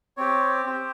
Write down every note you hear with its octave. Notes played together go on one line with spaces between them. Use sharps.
C4 G4 C#5
C4 G4 C5